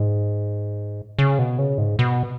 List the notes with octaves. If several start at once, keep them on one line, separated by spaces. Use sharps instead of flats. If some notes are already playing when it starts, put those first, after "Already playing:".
Already playing: G#2
C#3
B2
C#3
G#2
B2